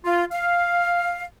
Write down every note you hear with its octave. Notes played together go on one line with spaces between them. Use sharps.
F4
F5